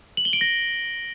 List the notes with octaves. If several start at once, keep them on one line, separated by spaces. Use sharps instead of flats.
F#7
G7
D7
A#6